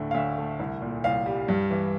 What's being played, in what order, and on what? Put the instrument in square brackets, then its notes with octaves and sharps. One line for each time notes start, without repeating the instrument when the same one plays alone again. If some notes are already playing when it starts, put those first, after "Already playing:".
Already playing: [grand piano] D2 A2 D3 A3
F5
D2 E5
A3
C2
A#2
C2 F5
G3
G2
E3